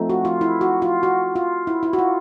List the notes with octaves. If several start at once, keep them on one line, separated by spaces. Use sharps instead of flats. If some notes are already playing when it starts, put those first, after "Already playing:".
Already playing: F3 A3 C4 D#4
F#4
F4
E4
F#4
F4
F#4
F4
E4
E4
F#4
F4